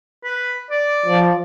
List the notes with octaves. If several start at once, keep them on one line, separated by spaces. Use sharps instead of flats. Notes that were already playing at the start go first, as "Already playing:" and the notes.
B4
D5
F3